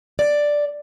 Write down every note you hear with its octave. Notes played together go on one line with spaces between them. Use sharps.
D5